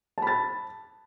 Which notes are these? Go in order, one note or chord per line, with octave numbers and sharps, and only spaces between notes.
A5 B5 A6